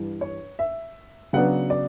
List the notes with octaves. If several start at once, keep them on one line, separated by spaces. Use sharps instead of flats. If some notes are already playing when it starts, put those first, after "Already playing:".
Already playing: G2 E3 G3
C#5
E5
C#3 F#3 B3 D4 F#5
D5